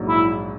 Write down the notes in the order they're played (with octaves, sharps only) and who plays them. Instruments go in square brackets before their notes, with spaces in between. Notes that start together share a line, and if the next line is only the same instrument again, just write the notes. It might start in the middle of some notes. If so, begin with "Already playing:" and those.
Already playing: [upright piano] A#1 G#2 F#3
[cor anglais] E4